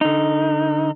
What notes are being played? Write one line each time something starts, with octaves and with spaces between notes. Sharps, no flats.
D3 D#4